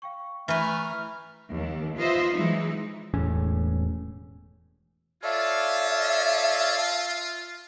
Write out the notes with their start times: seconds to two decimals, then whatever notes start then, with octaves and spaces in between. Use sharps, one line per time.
0.02 F5 G5 C#6
0.48 E3 A3 B4 E5 A#5 C#6 F6
1.51 D#2 D#3
1.98 F4 B4 C5 D#5 E5
2.32 E3 F#3 G#3 D#4
3.14 E1 E2 A2 C#4
5.23 F4 A4 C#5 D5 E5 F5